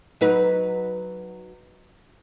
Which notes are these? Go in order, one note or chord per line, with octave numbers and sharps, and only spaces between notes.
F#3 D#4 B4